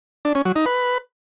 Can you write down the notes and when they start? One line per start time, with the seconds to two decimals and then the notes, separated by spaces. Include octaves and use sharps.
0.25 D4
0.35 C#4
0.45 F#3
0.56 D#4
0.66 B4